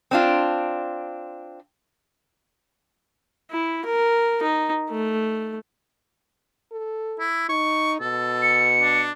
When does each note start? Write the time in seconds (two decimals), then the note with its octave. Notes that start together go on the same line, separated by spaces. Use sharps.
0.11 C4 D4 F4
3.51 E4
3.85 A#4
4.42 D#4
4.90 A3
6.72 A4
7.19 E4
7.49 D#4 C#6
8.00 B2 A4
8.42 C#7
8.81 D4